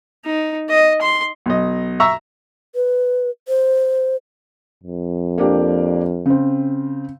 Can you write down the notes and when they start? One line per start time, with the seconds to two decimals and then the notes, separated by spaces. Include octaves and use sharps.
0.25 D#4
0.69 D#5
1.01 C6
1.46 B1 D#5
2.00 E5 A#5 C#6 E6
2.75 B4
3.48 C5
4.84 F2
5.38 A#3 D4 G4
6.26 C#3 C4